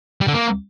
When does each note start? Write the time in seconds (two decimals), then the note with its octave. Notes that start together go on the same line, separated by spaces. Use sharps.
0.21 G3
0.27 D3
0.34 A#3